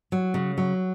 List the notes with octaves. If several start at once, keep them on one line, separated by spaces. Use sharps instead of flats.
F#3
C#3
F#3